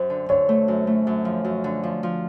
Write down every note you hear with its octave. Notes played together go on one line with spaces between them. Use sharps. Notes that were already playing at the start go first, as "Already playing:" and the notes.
Already playing: F#2 C5
D3
D3 C#5
A3
F#2
A3
F#2
F3
F#2
D3
F3
F3